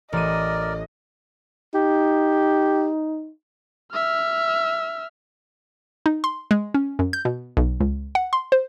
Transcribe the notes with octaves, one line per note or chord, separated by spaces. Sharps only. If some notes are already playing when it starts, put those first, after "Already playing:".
A1 A#4 D5 D#5 D#7
D#4 G4
E5 F6
D#4
C6
G#3
C#4
F#2
G6
B2
B1
C#2
F#5
C6
C5